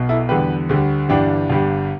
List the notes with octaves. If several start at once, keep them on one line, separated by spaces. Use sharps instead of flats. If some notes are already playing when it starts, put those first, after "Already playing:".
Already playing: B1 B2
E4 A4
E2 D3 G3 G4 B4
D2 D3 G3
G1 G2 E3 D4 G4
G1 G2 G3